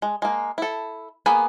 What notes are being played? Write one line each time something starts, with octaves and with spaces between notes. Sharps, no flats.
G#3
G#3 A#3
E4 A4
A#3 B3 G#4 G#5 B5